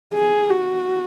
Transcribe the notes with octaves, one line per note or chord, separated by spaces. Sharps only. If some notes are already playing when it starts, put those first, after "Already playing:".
G#4
F#4